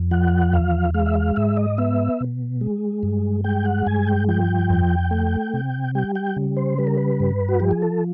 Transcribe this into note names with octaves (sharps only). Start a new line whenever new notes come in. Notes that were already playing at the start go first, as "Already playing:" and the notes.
Already playing: F2
F3 F#5
E2 F5
G#3 F5
E5
F5
G#2 E5
D#5
B3 E5
B2
G#3
G2
G#3 G5
F#5
G2 G#5
G5
F3 G5
F2
A3
C3
G3 G5
G5
C#3
C5
G3 B4
A#4
B4
G2
F#4
F3 G4
G#4
A4